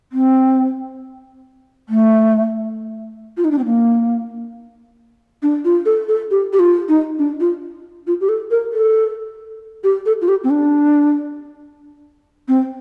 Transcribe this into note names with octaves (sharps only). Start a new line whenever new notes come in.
C4
A3
F4
D#4
D4
C4
A#3
D4
F4
A4
A4
G4
G4
F4
D#4
D4
F4
F4
G4
A4
A#4
A4
G4
A4
F4
G4
C4
D4
C4